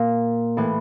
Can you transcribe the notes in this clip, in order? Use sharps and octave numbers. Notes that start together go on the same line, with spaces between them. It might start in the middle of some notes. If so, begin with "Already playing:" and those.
Already playing: A#2
A2 E3